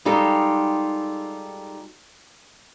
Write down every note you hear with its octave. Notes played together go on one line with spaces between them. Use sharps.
G3 G#3 D#4 F4 G4 A4